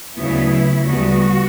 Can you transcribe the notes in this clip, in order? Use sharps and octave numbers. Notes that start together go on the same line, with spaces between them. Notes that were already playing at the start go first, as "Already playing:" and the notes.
D2 C#3 F#3 B3 E4
D2 C#3 G3 B3 F#4